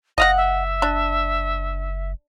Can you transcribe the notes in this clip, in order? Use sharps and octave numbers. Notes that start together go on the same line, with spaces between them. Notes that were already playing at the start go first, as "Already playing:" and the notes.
F#1 D#5 F5 F#5 A#6
E5
D4